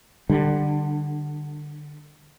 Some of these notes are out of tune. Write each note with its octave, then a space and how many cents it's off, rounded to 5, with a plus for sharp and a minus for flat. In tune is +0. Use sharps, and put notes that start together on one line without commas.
D3 +20 G3 +0